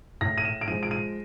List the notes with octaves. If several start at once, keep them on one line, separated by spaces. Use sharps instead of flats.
A2 A#6
D#7
E7
D7
F3 G#3 D#7
D7
D#7